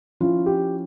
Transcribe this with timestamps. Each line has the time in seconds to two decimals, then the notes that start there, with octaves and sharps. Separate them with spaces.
0.20 F3 C#4 E4 F4
0.46 G4